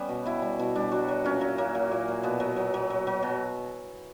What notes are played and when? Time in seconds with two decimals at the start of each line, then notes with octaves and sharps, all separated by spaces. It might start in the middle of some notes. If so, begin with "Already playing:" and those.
Already playing: G3 B3 C#4
0.09 B2
0.25 B2 E4
0.42 G3
0.59 B2 E4
0.75 G3 D4
0.91 F#3 F#4
1.08 F#3
1.24 A#2 C#4
1.41 F#3
1.58 F#3 A#3
1.75 F#3
1.92 A#2
2.08 A#2
2.23 B2 B3
2.40 F#3
2.56 F#3
2.74 F#3
2.90 F#3
3.07 F#3
3.23 B2